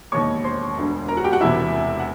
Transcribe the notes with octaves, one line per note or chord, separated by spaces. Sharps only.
E1 D#2 D#3 C#5 C#6
C5 C6
E1 D2 D3
A#4 A#5
F#4 F#5
G4 G5
F#4 F#5
E1 E2 C3 E4 E5
F#5